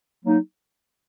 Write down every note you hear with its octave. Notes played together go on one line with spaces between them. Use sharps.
F#3 A#3 D#4